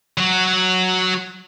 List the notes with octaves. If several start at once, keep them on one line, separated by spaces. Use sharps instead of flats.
F#3 F#4